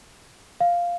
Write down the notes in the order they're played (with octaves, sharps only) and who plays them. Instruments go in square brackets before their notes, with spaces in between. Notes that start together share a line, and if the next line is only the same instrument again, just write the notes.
[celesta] F5